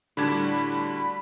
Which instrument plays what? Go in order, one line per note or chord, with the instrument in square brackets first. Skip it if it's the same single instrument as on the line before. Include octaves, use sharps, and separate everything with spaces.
[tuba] A2 [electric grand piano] D3 G#6 [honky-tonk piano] G3 D4 F#4 [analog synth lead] B5